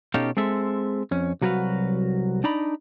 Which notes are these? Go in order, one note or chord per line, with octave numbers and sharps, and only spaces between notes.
B2 C#4 D#4 G4 A4 F5
G#3 C4 A4 E5
F2 C#4
C2 F#3 F#4 A4 B4 F5
D4 D#4 D5 A#5 B5